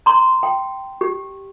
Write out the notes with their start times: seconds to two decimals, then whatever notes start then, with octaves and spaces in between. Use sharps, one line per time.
0.06 A#5 C6
0.43 G5
1.01 G4